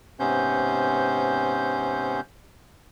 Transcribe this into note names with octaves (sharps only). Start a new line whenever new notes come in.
G#2 C3 B3 C#4 C5 G6